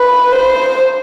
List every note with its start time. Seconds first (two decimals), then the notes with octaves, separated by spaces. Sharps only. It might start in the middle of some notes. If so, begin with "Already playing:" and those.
Already playing: B4
0.31 C5